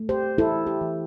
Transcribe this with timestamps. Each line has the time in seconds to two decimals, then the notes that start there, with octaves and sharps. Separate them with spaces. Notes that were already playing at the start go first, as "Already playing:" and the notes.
Already playing: A3
0.09 G4 C5
0.37 E3 E4 A4
0.67 G4
0.81 E3